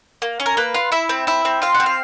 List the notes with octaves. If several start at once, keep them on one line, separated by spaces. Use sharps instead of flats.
A#3
C#4
A#4
A#3 B4
F4
E4 E5
C4
E4 E5
C4
F4 F5
F#5
C4
F5